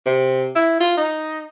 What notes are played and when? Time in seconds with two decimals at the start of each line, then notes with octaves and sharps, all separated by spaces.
0.06 C3
0.55 E4
0.80 F4
0.97 D#4